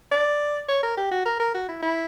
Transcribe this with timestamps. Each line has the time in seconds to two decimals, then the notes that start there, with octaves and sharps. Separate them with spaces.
0.12 D5
0.69 C#5
0.83 A#4
0.97 G4
1.11 F#4
1.26 A#4
1.39 A#4
1.54 F#4
1.68 E4
1.82 E4